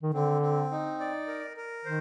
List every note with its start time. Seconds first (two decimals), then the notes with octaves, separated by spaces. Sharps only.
0.03 D#3
0.13 D3 C4
0.42 C4
0.71 D#4
1.00 D5
1.28 A#4
1.57 A#4
1.85 D#3 C5